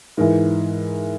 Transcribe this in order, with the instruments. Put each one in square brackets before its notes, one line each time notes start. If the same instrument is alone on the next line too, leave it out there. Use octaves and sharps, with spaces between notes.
[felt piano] G#2 E3 A#4